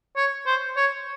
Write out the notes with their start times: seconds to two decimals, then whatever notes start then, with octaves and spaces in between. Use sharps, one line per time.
0.16 C#5
0.46 C5
0.76 C#5